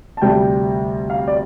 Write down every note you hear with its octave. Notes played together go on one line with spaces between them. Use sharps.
A5
D2 C3 G3 G5
F5
D5